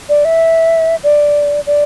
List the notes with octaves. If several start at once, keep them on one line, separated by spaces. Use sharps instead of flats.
D5
E5
D5
D5